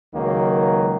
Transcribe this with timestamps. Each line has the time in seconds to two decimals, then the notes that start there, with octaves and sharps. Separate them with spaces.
0.14 C#2 D#3 F#3 A#3